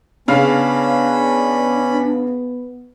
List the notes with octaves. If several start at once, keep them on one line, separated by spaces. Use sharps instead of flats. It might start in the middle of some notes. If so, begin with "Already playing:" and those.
C#3 B3 C#4 D4 F5 B5 F6